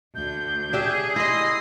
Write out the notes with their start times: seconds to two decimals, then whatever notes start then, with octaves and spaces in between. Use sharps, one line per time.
0.15 D2 G6
0.73 D4 G4 G#4 E5
1.16 E4 D#5 C6 D#6 A#6